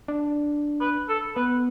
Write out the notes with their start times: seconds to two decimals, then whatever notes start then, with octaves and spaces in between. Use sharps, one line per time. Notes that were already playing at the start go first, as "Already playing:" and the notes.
0.08 D4
0.81 B4
1.09 A4
1.36 B3 B4